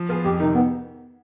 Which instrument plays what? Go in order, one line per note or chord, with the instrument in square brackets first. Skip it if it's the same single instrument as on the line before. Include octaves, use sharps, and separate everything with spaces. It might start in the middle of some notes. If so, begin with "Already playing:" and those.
Already playing: [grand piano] F3
B3 F4 G#4
[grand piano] F2 [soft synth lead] G4
[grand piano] C3 D#3 [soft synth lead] D#4
[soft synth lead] B3